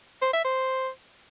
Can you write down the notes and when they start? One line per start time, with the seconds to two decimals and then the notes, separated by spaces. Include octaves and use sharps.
0.22 C5
0.33 E5
0.44 C5